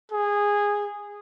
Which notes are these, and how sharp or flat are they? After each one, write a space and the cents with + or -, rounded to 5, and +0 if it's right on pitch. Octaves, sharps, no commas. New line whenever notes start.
G#4 -15